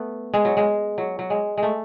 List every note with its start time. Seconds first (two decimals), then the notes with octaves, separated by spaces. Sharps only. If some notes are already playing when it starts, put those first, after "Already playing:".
Already playing: A3 B3
0.34 G#3
0.45 F#3
0.57 G#3
0.98 F#3
1.19 F#3
1.30 G#3
1.58 G#3
1.63 A3